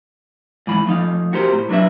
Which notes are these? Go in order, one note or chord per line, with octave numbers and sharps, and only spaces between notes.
G#2 E3 B5
F3 A3 D#4 F5
F#4 G4 A#4 C5
A2
F#3 D4 F#4 B4 E5